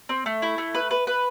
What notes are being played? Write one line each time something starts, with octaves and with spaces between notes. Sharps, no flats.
C4
A3
E4
A3
B4
B4
B4